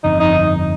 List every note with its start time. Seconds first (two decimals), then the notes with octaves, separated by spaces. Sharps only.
0.04 G1 F2 D3 D#4
0.20 D#4